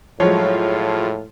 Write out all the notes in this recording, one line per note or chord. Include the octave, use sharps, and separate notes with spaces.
A2 F3 F#3 G#3 F4 C#5